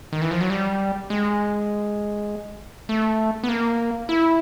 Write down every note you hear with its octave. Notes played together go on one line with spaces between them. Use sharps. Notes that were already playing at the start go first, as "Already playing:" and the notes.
D#3
E3
F3
F#3
G3
G#3
A3
B3
A#3
E4